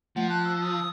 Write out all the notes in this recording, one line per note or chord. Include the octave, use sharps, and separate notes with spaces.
F3 A3 F#5
A5 F#6
E6
D#6